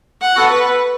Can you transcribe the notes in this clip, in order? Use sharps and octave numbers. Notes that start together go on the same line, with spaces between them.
F#5
B3 F#4 A4
B4